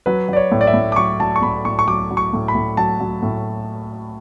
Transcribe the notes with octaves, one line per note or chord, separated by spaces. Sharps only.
F#3 B4
F#3 D5
C#5
A2
D5
E5
A2
D6
F#3 C#6
F#3 A5
C#6
A2 B5
A2 C#6
C#6
F#3 D6
F#3
C#6
A2
B5
A2
F#3 A5
F#3
A2